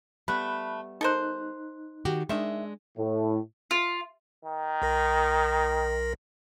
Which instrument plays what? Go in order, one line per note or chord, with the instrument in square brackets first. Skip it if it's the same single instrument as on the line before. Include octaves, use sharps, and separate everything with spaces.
[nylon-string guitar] G3 B3 [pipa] A3 [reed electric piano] B5 F#6
[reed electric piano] D#4 F#6 [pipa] A4 A#4 C5
[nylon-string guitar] D#3 F#4 G4
[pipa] D#3 E5 [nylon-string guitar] G#3 D4
[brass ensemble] A2
[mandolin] F4
[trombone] D#3
[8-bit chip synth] B1 A#4 A#6